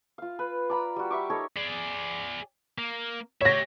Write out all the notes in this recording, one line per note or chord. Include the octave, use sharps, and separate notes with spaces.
F4 F5
B4
D5 A#5 B5
G3 F#4
G4 E5 C#6 D6
D#4 A4 A#4 C#5
G#4 D5
A#3
G4 C#5 E5 A#6